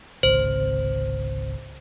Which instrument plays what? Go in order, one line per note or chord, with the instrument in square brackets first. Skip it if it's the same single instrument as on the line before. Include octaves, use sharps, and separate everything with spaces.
[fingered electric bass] G#1 C#2 C3 [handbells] C5